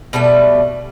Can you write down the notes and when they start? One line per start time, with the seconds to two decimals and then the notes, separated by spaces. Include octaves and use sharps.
0.13 B2 G3 A3 B4